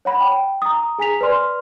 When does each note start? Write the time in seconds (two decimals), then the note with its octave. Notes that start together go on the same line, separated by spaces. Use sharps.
0.05 C#5 F#5 B5
0.21 G5
0.62 A#5 D#6
0.98 G#4 G#5 A#5 B6 F7
1.21 B4 C5 D5 C6 F6